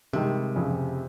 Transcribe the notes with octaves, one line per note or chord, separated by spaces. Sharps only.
G2 C3 D#3 G#3
F1 F2 C#3 F3